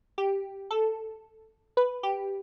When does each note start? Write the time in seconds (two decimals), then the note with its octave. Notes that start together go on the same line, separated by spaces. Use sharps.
0.18 G4
0.71 A4
1.77 B4
2.03 G4